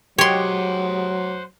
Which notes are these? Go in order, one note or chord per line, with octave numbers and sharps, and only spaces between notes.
F#3 G#3 G4 C5 C#5 F#5 C6